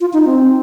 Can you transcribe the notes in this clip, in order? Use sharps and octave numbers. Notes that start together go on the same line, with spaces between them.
F4
D#4
C4